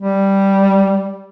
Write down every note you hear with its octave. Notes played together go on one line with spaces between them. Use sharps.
G3